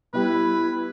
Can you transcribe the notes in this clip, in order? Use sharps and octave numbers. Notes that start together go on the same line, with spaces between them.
G3 B3 E4 B4